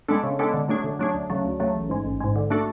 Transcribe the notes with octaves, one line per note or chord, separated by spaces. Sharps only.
G#3 B3 D4 A4
C#3
G#3 B3 D4 A4
D3
F#3 A3 D4 G#4
D3
F#3 A3 D4 G#4
D2
C#3 F#3 A3
D2
C#3 F#3 A3
A1
G#2 G#3
A1
G#2 G#3
D3
A3 D4 F#4 A4